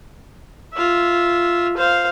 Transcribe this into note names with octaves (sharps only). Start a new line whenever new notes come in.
F4 E5
C5 F5